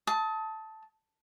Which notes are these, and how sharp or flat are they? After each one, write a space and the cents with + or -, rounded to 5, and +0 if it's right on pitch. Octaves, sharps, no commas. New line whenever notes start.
A5 +0 D#6 +35